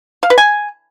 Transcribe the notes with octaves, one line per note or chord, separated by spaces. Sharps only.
F5
B4
G#5